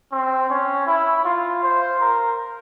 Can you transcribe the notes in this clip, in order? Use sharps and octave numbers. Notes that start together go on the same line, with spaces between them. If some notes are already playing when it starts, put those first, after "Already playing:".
C4
C#4
E4
F4
C5
A#4